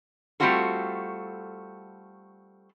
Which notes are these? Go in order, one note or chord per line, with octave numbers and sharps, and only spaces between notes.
G3 A3 C4 F4 F#4 A4